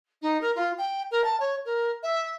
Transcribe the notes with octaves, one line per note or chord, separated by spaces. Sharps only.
D#4
A#4
F4
G5
A#4
A5
C#5
A#4
E5